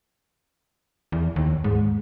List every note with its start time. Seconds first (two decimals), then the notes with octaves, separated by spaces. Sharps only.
1.12 E2
1.36 D#2
1.64 G#2